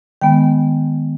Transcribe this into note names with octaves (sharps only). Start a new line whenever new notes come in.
D#3 G#3 B3 G5